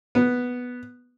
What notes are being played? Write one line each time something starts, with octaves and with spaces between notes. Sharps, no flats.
B3